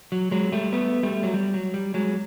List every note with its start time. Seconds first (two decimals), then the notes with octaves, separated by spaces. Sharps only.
0.12 F#3
0.31 F#3 G#3
0.52 G3 A3
0.73 A3 B3
1.03 G3 A3
1.23 F#3
1.34 G3
1.54 F#3
1.74 G3
1.94 F#3 G#3